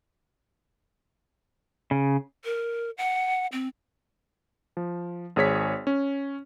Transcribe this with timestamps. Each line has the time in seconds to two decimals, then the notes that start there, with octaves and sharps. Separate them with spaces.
1.91 C#3
2.44 A#4
2.98 F#5
3.52 C4
4.77 F3
5.36 G#1 G#4 C#5 B6
5.87 C#4